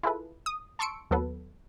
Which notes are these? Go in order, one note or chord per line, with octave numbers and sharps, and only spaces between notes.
E4 F4 G#4 A4 B4
D#6
A5 C6 C#6 E6 C#7 D7
D#2 F#3 B3 A4 B4